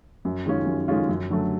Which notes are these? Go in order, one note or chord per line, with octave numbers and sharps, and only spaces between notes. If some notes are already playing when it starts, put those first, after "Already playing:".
F#2
D#3 G#3 C#4 F4
F#2
D#3 G#3 C#4 F4
F#2
D3 F#3 A3